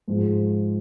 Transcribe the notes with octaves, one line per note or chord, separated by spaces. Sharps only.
G#2 F3 G#3